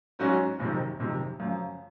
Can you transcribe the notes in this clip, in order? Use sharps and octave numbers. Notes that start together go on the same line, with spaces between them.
G#2 F#3 C#4 F#4
F#1 F2 C3 D#3
F#1 F2 C3 D#3
F#2 C#3 F3